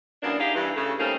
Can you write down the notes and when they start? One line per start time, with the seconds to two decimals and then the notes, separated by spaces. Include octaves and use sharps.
0.23 F#2 E3 A#3 B3 D4
0.39 D#4 G4 G#4 F5
0.54 G2 E3
0.76 C#3 A3
0.99 G3 A3 A#3 C4 C#4 D#4